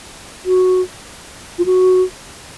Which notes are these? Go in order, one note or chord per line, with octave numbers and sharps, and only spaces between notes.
F#4
F4
F#4